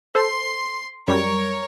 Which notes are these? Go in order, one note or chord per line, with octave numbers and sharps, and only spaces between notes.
A4 C5 C6
F#2 G3 A#4 C#5